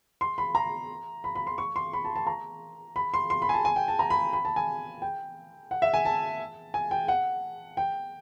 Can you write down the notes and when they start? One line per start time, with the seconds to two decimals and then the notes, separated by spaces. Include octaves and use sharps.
0.21 C6
0.38 B5
0.55 A#5
1.24 B5
1.35 B5
1.47 C6
1.58 C#6
1.76 C6
1.93 B5
2.05 A5
2.16 A5
2.27 A#5
2.96 B5
3.14 C6
3.30 C6
3.42 B5
3.49 G#5
3.54 A5
3.65 G#5
3.76 G5
3.88 A5
3.99 A#5
4.10 B5
4.33 B5
4.45 A5
4.56 G#5
5.02 G5
5.71 F#5
5.82 E5
5.94 G#5
6.05 A5
6.74 G#5
6.91 G5
7.08 F#5
7.77 G5